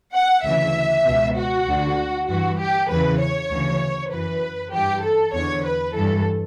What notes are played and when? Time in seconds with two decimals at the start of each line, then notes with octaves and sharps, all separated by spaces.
0.14 F#5
0.44 D2 C#3 E3 E5
1.05 C#2 B2
1.36 F#4
1.67 D2 D3
2.28 G2 E3 F#4
2.59 G4
2.89 E2 C#3 E3 B4
3.20 C#5
3.50 D2 C#3 E3
4.11 F#2 E3 B4
4.72 G2 E3 G4
5.03 A4
5.33 E2 D3 C#5
5.64 B4
5.94 G2 E3 A4